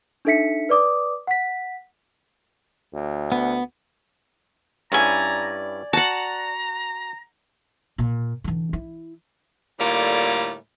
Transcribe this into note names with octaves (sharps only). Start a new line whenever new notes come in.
D4 D#4 A4 E5 B6 C#7
B4 D5 D6 D#6
F#5 B6
D2
B3
G2 C#4 E4 D5 G#5 A#5
F#4 F#5 A5 A#5
A#2
D3 E3
E4
A2 D3 G3 A#3 F4